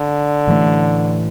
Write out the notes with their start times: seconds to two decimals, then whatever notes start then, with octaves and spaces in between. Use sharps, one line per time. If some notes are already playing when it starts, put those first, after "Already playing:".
Already playing: D3
0.47 A2 E3 A3